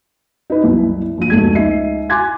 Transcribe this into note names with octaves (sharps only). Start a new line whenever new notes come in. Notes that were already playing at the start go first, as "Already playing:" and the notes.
D#4 E4 B4
F#1 C2 E4
A#1 F3 D#7
F1 C#2 G#2 A3 F#4 G#6
C#2 D#4 E5 C7
G#5 C6 D6 F#6 G#6 A6